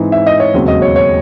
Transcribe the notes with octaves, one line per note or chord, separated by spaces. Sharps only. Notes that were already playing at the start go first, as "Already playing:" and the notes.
Already playing: G#2 E3 C4 D#4
E5
D#5
C#5
E1 D#2 C#3 F#3 C4
D#5
C#5
C#5